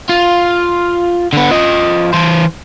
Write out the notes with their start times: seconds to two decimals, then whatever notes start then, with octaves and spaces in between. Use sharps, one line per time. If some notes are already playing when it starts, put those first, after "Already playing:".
0.09 F4
1.33 D3 B3
1.51 F3 D#5
2.13 E3 C5